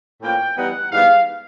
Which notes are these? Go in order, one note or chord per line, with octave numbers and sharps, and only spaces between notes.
A2 F3 A#3 C#4 G5
E3 G3 B3 D#4 F#5
G#2 E3 G3 B3 F5